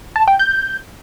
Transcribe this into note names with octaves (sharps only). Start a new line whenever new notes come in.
A5
G5
G6